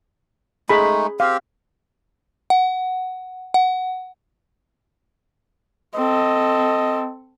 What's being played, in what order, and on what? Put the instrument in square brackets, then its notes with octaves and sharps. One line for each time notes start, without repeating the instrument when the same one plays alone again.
[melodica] G#3 A3 D#4 [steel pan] G#4 B5
[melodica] C4 G4 [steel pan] F5
[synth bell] F#5
F#5
[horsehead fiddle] C4 A4 [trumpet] D#5